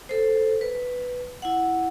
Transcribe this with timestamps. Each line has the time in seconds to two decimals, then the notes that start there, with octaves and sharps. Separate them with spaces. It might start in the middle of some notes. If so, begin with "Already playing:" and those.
0.09 A4 C5
0.61 B4
1.42 E4 F#5